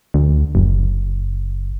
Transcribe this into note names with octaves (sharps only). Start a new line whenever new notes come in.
D2
F#1